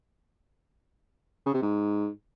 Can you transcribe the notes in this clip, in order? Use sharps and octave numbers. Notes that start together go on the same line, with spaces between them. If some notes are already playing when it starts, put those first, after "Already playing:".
C#3
C3
G#2